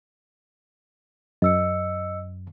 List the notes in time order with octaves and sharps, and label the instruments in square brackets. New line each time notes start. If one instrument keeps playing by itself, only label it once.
[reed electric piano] F#2 [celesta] D#5 E6 C#7